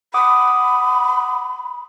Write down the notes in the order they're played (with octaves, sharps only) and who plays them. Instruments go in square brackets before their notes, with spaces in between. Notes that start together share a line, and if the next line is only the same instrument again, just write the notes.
[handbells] F#5 D6 D#6 [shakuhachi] B5